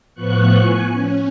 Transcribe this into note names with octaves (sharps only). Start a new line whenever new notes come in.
A2 F3 B3 C#6 F#6
G#5
C#4